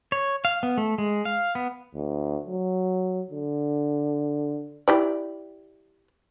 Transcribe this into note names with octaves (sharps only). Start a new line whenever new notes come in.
C#5
F5
B3
A3
G#3
F5
B3
D2
F#3
D3
E4 G4 D5